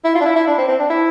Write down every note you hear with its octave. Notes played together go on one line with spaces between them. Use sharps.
E4
F4
D4
E4
E4
D4
C4
C4
D4
E4